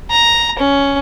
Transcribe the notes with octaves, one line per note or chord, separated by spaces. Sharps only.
A#5
C#4